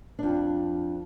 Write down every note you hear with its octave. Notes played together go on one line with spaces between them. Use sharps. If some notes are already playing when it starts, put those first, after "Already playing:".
F2 D4